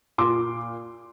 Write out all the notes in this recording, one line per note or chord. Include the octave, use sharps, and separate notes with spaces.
A#2 C6 D6